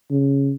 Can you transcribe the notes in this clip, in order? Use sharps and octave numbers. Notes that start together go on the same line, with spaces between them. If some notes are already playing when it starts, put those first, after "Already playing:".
C#3